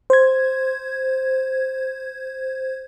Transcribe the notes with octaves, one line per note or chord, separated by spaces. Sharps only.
C5 G#6